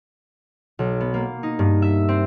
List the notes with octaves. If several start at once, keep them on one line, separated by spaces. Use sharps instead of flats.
B1
B3
A#3
D#4
G2
E5
C4